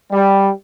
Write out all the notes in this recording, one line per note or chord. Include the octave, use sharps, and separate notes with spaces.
G3